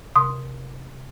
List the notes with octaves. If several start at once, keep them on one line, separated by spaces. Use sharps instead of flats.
C3 C6 D#6